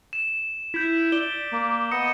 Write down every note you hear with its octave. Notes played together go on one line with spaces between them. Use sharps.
E7
E4 G6 B6
D5 G7
A#3
B3 D#5 C#7